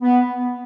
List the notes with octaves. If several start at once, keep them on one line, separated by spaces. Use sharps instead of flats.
B3